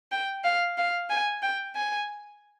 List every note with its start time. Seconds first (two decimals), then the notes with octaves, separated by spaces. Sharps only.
0.12 G5
0.45 F5
0.78 F5
1.11 G#5
1.42 G5
1.76 G#5